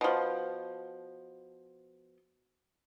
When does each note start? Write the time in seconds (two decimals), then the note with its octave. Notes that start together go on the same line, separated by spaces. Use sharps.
0.01 B2 F3